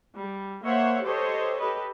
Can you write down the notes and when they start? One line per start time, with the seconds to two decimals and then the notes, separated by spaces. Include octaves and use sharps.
0.18 G3
0.65 A#3 C5 C#5 E5 F#5
1.04 G4 A4 C5 C#5 D#5
1.59 G4 A4 B4 D#5